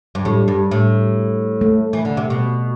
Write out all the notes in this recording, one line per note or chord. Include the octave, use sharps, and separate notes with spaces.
G2
A2 G3
G2
A2
A3
E3
D3
C3
B2